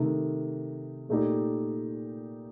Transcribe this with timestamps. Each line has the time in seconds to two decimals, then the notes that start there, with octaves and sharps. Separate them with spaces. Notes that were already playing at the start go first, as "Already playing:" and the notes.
Already playing: C3 D#3 A3 D#4
1.09 A#2 A3 D#4 G4